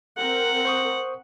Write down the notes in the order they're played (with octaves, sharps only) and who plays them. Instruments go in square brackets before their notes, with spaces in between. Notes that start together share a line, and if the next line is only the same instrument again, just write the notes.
[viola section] C4 A#4 [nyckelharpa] F#5
[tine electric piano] C5 C#6 D#6